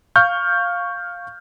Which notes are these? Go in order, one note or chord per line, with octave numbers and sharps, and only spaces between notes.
F5 C#6 F6 G6